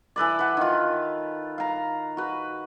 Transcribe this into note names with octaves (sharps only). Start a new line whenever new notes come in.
E3 A4 B4 D5
B4 F#5
D#3 F4
F5 A#5
F#4 B4